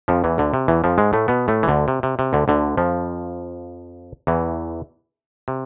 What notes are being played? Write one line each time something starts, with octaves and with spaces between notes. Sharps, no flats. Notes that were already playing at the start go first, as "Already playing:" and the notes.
F2 F3
E2 E3
D2 D3
C3
E2 E3
F2 F3
G#2 G#3
A2 A3
B2 B3
A2 A3
E3
D2 D3
C3
C3
C3
D2 D3
D2 D3
F2 F3
E2 E3
C3